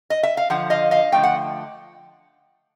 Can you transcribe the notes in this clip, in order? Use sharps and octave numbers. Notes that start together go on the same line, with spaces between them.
D#5
E5
F5
D3 F3 F#5
D#5 F5
D#5 F5
D3 F3 A3 G5
F#5